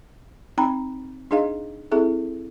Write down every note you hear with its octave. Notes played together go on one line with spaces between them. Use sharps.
C4 D#4 G5 A#5 B5
D4 D#4 G#4 D#5 F5
C4 E4 G#4 A4 E5